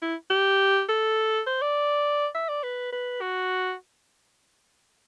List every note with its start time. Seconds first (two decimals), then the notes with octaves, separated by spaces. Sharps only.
0.02 E4
0.30 G4
0.89 A4
1.46 C5
1.61 D5
2.35 E5
2.49 D5
2.63 B4
2.92 B4
3.21 F#4